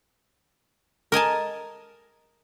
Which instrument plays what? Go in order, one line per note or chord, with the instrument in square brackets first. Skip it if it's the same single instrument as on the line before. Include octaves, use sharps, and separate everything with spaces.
[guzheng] A#4 D#5 G#5 A5